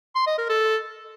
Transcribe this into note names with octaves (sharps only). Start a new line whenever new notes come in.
C6
D#5
A#4
A4